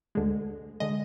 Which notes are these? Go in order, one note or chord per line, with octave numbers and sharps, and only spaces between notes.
D2 D3 G#3
D3 G#3 D#5